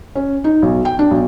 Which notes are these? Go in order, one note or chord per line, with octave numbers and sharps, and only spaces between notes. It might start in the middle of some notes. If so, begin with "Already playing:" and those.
C#4
D#4
B1
G5
D4
B1